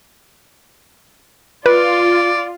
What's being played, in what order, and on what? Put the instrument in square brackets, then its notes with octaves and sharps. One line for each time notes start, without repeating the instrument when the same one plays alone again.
[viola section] F4 [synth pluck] B4 [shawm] D5